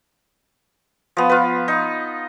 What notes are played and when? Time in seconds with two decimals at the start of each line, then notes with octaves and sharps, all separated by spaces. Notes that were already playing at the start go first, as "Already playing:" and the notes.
1.17 F3 B3
1.29 F4 B4
1.68 D#4